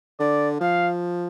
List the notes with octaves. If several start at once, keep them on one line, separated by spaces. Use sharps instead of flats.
D3 D5
F3 F5